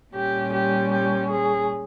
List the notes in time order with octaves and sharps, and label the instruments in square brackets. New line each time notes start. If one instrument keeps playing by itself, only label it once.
[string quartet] A#2 G3 C#4 G4
G4
G4
G#4